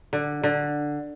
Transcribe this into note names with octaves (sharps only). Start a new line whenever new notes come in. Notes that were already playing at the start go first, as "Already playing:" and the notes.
D3
D3